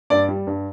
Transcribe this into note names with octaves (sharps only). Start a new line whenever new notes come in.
G2 D5
G3
G2